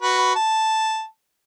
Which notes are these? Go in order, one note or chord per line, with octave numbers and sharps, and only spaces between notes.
F#4 B4
A5